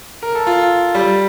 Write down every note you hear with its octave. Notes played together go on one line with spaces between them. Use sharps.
A#4
A4
F4
G3